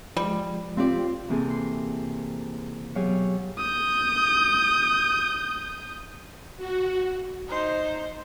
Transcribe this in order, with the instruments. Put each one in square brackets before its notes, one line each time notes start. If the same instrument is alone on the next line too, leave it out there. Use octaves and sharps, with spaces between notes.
[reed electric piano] F3 G#3 [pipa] G3
[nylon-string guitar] C4 G4 D5 [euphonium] F4
[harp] C3 E3 A#3 C4 G#4 A4
C6
B2 F#3 G4 G#4 C#5 F5
[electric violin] D#6 G6
[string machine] F#4
[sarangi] D#4 [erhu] C5